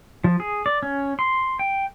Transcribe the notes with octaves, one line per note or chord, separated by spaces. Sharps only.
F3
G#4
D5
C#4
C6
G5